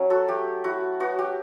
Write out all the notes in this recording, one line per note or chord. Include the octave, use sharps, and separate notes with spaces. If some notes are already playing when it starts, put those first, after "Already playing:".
Already playing: F#3 C#4
F#4 A4
A3 G4
E4 F#4
B3 F#4
G4